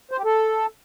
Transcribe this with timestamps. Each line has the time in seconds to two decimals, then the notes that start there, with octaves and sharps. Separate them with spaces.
0.11 C5
0.18 G4
0.25 A4